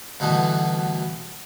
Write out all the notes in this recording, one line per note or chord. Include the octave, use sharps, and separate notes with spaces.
D2 G2 B2 E3